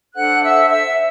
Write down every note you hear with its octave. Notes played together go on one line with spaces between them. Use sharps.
D4 A4 C5 F#5 F#6
E5 E6
E5 E6